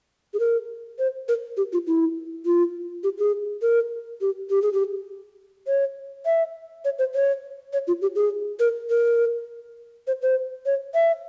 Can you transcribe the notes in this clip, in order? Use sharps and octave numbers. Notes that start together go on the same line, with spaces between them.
G#4
A#4
C5
A#4
G4
F4
E4
F4
G4
G#4
A#4
G4
G4
G#4
G4
C#5
E5
C#5
C5
C#5
C#5
F4
G4
G#4
A#4
A#4
C5
C5
C#5
E5